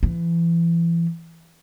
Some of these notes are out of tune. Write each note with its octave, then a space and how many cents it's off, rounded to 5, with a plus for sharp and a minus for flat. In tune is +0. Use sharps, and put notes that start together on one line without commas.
E3 +30